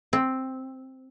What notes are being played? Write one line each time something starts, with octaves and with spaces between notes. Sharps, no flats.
C4